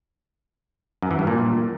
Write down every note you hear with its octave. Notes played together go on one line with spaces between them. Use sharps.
F#2
E3
G2
A#2